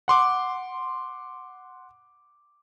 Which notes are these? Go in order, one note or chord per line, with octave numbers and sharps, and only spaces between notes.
F#5 C6 D6